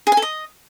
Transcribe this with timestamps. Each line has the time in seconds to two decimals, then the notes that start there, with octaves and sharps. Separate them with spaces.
0.07 G#4
0.12 G#5
0.17 A4
0.22 D#5